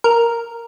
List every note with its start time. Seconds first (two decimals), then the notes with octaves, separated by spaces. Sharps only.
0.04 A#4